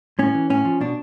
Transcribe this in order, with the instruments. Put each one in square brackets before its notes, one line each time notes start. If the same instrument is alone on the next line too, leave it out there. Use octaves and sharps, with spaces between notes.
[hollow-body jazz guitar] A2 C#4
E3
A2 C#4
F3
B2 D4